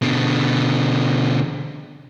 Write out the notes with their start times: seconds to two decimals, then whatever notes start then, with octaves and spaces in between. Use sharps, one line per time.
0.02 B2 D3